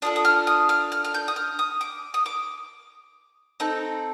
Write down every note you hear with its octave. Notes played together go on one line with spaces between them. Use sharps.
D4 F4 A4 D#6
D#6
F6
D#6
F6
F6
F6
G6
D#6
F6
D#6
D6
D#6
D6
C4 D#4 A4